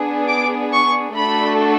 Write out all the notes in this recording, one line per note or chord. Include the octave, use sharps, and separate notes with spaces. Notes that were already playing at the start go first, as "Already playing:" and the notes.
Already playing: B3 D4 G#4
D6
C#6
A3 D4 F#4 A4 B5